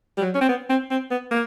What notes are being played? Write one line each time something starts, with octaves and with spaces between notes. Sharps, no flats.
G3
F#3
C#4
C4
B3
C4
C4
B3
A#3